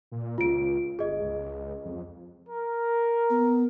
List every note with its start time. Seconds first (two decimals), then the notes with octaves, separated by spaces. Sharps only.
0.12 A#2
0.38 C#2 F4 D7
0.99 G1 G#4 D#5
1.20 C#2
1.85 F2
2.48 A#4
3.30 B3